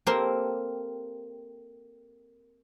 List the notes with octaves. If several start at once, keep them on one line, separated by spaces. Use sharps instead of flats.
A#3 C4 G4 A4 A#4